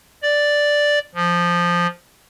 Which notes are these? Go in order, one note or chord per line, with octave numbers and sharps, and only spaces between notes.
D5
F3